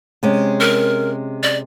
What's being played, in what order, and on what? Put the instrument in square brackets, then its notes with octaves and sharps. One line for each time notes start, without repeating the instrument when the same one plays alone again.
[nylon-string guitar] C3 G#3 C#4
[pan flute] A#4
D5